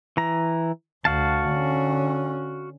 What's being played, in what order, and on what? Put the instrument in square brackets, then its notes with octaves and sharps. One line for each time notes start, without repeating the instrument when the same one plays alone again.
[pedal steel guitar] E3 A#5
[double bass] D2 [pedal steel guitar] F#4 F5 A5
[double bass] D3 C#4